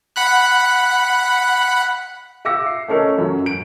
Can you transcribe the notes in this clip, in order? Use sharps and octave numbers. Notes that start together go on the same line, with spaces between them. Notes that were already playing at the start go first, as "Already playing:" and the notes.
F#5 B5 F#6
E5 F5 D6 E6 A#6 C#7
C7
A3 C#4 A4 A#4 D#5
F#2 F#3
D7